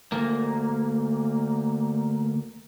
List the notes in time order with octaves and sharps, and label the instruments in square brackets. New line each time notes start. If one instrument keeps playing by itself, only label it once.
[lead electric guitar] D2 A#3